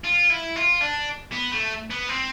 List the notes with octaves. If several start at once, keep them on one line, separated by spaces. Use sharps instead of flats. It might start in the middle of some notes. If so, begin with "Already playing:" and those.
F4
E4
F4
D4
B3
A3
B3
C4